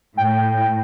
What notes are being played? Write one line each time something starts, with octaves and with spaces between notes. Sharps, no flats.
A2 G5